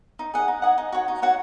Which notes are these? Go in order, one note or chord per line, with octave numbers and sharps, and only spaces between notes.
D#4
G#4 D#5 F#5
D#4
G#4 D#5 F#5
D#4
F#4 C#5 F#5
D#4
F#4 C#5 F#5